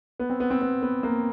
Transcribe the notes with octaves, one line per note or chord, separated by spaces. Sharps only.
B3
C4
B3
C4
B3
B3
A#3